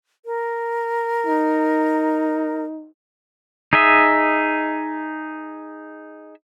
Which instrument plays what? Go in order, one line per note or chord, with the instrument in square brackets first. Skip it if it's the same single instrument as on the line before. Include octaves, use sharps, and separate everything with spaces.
[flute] A#4
[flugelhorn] D#4
[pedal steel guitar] D#4 G#4 D#5 E5